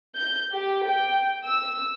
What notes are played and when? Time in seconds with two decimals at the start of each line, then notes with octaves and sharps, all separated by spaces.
0.16 G6
0.54 G4
0.88 G5
1.45 E6